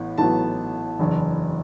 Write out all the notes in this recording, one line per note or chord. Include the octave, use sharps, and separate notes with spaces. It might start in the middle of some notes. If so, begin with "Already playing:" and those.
Already playing: A1 A2 B3
A1 A2 F#3 B3 A5
F#1 E2 E3 D4